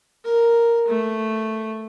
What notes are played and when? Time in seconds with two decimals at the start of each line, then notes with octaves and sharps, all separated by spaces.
0.24 A#4
0.88 A3